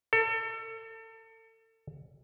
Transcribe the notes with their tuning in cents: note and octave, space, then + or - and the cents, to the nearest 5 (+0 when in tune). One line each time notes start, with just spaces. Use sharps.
A4 +35